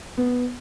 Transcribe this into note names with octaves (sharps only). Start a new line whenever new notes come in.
B3